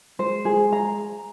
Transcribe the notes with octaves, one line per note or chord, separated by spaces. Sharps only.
G#3 C5
G#4
A#5